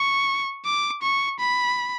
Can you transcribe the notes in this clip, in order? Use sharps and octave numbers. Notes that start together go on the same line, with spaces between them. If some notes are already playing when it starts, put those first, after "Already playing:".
Already playing: C#6
D6
C#6
B5